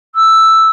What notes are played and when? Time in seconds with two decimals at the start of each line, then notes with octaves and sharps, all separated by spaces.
0.15 E6